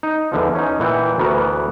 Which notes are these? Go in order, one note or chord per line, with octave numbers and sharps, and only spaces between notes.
D#4
E2 D3 F3
C#4 D#4
A#2 E3 F#5 G5
D2 E3 B3 F#4 A#4